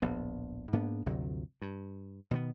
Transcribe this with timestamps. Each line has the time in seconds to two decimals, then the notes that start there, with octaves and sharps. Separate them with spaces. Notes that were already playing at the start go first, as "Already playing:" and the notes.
0.02 D1 A#1 B3
0.73 G#2 A#3 B3 D4
1.06 G1 D2 C3 F#3
1.62 G2
2.31 B2 D#3 G#3 B3